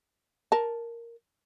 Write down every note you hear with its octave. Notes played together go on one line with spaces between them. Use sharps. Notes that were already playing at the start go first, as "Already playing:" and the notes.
A#4 A5